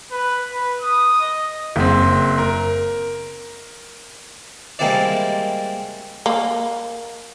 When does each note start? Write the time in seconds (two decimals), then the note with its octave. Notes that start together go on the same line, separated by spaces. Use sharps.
0.11 B4
0.52 B4
0.82 D#6
1.21 D#5
1.76 F#1 C4
2.38 A#4
4.79 G3 G#3 A#3 C4 E4 D5
6.26 A#3